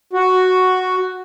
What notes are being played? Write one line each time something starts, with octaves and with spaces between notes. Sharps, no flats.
F#4